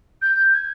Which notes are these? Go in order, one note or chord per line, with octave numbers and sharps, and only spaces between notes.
G6
G#6